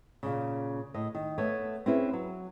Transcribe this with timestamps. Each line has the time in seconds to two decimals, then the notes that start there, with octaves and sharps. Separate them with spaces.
0.23 A#2 C#3
0.94 A2 D#5
1.15 D#3
1.38 A3 B3 C#5
1.86 C4 C#4 E4 G#4 B4
2.13 F#3